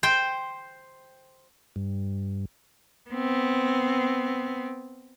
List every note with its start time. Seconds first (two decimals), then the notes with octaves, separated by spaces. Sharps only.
0.03 C5 G5
1.76 G2
3.10 B3 C4